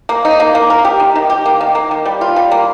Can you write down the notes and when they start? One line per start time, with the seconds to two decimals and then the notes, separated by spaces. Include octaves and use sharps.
0.09 A#3
0.25 D#4
0.40 A#3
0.55 A#3
0.70 A#4
0.85 G4
1.00 D#3
1.16 D#3
1.30 G4
1.46 A#3
1.61 D#3
1.75 A#3
1.91 D#3
2.05 G3
2.21 F4
2.36 G3
2.51 A#3